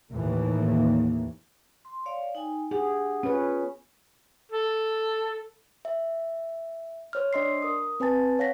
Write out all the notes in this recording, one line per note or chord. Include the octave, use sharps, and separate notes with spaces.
D#2 A2 E3 A#3
C6
C#5 D5 F5
D#4 G5 G#5
D4 G4 G#4 F#5
B3 C#4 F4 B4 C#5
A4
E5
C5 C#5 F6
D4 D5 D#5 C6 E6 C7
A#4 D#6
C4 B4 G#5 A5 A6
C#5 F5 F#5 A#6 B6